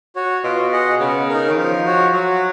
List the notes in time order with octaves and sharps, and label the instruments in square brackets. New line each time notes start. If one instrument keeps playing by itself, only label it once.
[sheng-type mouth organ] F#4 C#5
[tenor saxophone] B2 [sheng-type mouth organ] F4
[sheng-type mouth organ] G#4 D#5 F#5
[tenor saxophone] C#3 [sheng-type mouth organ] B3
[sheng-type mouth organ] D#4 A#4
[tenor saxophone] D#3
[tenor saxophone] F3 [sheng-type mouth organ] D#4
[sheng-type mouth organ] F#4 C#5
[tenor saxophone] F#3 [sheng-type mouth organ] F#4